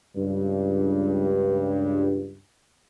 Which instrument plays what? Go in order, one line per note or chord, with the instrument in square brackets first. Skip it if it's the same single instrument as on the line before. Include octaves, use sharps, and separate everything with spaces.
[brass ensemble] C#2 G2